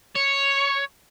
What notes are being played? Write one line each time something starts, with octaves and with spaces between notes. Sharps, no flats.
C#5